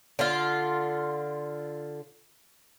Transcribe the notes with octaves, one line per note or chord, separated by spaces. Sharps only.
D3 F4